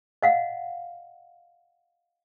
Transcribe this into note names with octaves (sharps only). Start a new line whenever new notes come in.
D#5 F5 F#5